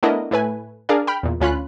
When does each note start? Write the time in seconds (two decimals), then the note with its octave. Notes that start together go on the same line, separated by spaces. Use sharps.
0.03 A3 B3 D4 E4 A#4 D#5
0.31 A2 A3 B4 G#5
0.89 D4 G#4 A#4 D5 F5
1.07 G5 B5 F6
1.23 E2 A#2
1.41 D2 C#4 F4 B5 F#6